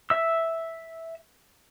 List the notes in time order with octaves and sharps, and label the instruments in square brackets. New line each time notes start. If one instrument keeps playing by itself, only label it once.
[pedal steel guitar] E5 E6